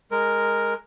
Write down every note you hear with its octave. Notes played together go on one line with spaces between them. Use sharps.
G#3 A#4